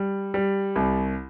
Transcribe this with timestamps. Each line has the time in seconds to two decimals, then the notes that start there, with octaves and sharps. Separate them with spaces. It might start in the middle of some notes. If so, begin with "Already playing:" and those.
Already playing: G3
0.34 G3
0.76 C2